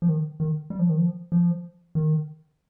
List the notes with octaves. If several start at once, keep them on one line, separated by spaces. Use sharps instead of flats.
F3
D#3
D#3
G3
F3
D#3
F3
F3
D#3